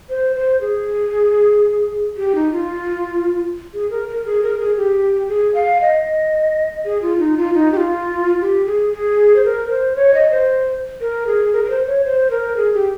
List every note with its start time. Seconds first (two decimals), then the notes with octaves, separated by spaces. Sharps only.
0.10 C5
0.36 C5
0.61 G#4
2.17 G4
2.35 D#4
2.52 F4
3.74 G#4
3.91 A#4
4.08 A#4
4.25 G#4
4.43 A#4
4.60 G#4
4.77 G4
5.29 G#4
5.54 F5
5.81 D#5
6.85 G#4
7.02 F4
7.19 D#4
7.37 F4
7.54 D#4
7.72 G4
7.77 F4
8.41 G4
8.66 G#4
8.93 G#4
9.36 C5
9.45 A#4
9.70 C5
9.96 C#5
10.14 D#5
10.31 C5
11.01 A#4
11.27 G#4
11.53 A#4
11.65 A#4
11.70 C5
11.87 C#5
12.05 C5
12.31 A#4
12.57 G#4
12.74 G4